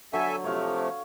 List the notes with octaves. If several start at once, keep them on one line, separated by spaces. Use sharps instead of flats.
D3 F#3 A4 E5 G#5
C3 F3 A3 C#5 F5